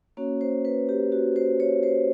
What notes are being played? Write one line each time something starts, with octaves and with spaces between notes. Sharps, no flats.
A#3 C#4 F#4 C#5
C5
B4
G4
F#4
C5
C#5
C5